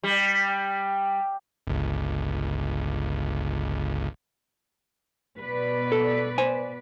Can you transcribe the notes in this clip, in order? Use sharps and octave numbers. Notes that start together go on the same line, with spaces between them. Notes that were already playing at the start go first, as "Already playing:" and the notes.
G3
G1 C#2
B2 B4 D5
A4
C5 G#5